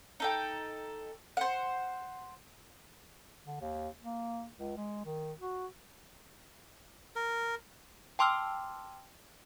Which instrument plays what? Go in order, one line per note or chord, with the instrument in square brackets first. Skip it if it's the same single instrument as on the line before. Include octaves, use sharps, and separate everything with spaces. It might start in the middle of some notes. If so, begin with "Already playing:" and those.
[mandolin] D#4 A4 G5
C5 F#5
[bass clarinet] D3
D#2
A#3
C#2
G#3
D#3
F#4
[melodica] A#4
[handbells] G5 A5 C6 D6 E6 F6